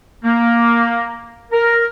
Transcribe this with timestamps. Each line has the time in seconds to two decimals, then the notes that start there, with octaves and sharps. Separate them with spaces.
0.24 A#3
1.52 A#4